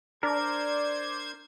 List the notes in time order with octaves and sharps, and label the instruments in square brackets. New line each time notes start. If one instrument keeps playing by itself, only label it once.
[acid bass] D4 [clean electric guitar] A#4 [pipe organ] C5 G#6 [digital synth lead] D5